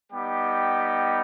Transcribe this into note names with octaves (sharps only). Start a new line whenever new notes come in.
G3 B3 D#4 G4 G5